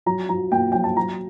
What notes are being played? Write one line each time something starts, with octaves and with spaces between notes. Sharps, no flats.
F#3 A#5
F#3 A#5
A#3 G5
F#3 G5
A5
F#3 A#5